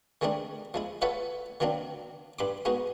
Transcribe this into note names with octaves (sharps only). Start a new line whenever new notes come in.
D#3 G#3 A3 C4 D4 E4
F3 G#3 E4
F4 A4 B4 C#5 E5 F#5
D#3 F#3 A#3 C4 D4
G2 B5 C6 D6
G#3 B3 D#4 F#4